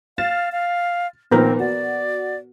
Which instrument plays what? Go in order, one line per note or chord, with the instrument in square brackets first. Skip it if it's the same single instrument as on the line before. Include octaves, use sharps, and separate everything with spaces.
[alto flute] F5 [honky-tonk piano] F6 A6 E7
[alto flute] F5
[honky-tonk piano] A#2 D#3 F3 [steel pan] B3 A#4 [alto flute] C4
[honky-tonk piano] F#4 [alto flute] D5